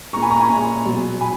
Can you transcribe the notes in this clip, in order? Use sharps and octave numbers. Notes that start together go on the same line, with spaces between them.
A#2 G#3 A#5 C#6
G#5 B5
A#5 C#6
G#5 B5
A#2 G#3
B2 F#3
B2 G#5 B5